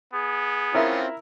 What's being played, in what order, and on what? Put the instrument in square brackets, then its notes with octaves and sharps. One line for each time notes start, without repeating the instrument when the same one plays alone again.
[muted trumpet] B3 [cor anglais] G#4
[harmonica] C4 C#4 F4 [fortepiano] E4 A#4 E5